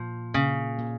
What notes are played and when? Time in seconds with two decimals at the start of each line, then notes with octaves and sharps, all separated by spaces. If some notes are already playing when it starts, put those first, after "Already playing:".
Already playing: A#2 F3
0.34 A#2 C#3
0.78 A#2